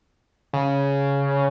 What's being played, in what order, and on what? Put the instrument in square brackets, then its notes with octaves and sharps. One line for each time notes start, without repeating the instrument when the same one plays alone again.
[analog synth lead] C#3